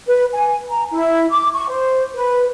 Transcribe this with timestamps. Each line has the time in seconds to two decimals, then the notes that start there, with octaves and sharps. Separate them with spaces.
0.08 B4
0.33 G#5
0.70 A#5
0.92 E4
1.31 D6
1.54 C#6
1.69 C5
2.14 B4